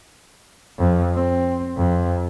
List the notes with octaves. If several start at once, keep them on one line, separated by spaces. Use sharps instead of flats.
F2
C4
F2